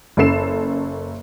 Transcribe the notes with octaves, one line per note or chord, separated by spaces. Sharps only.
F#1 C#4 A4 C7 E7